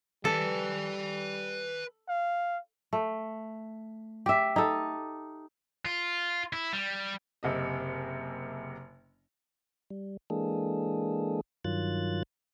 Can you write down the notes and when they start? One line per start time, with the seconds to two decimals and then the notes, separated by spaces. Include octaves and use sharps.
0.25 G3 A4 B4 G#5
2.08 F5
2.93 A3
4.26 G4 E5
4.56 D#4 A4
5.85 F4
6.53 E4
6.73 G3
7.43 F#1 C3 D#5
9.90 G3
10.30 E3 G#3 A#3 D4 G#4 A4
11.65 G2 D#3 F#3 F4 F#6 A6